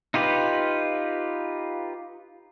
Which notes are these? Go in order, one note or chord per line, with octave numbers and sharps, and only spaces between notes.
D#4 F4 G4 B4